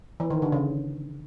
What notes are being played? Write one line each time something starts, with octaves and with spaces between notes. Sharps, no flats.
E3
D#3
D3
C#3